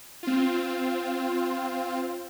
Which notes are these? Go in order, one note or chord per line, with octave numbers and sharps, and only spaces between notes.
C4 F4